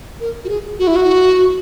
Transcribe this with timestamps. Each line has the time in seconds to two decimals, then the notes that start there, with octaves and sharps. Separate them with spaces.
0.20 A#4
0.45 F#4
0.49 G#4
0.79 F#4
0.87 E4
0.96 F#4